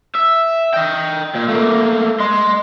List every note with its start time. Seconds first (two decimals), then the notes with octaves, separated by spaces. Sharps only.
0.15 E5
0.73 D#5 G5
1.35 A#2
1.48 A3 A#3
2.20 D#5 C6